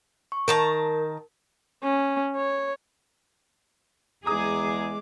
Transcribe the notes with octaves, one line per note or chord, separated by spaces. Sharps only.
C#6
D#3 A#4 A5 A#5
C#4
C#5
E2 G#3 G#4 A#5 D6 D#6